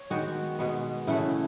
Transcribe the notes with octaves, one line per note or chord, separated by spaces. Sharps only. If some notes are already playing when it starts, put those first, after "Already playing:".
Already playing: C#5
D#3 G#3 B3 F#4
B2 G#3 B3
C#3 E3 A3 E4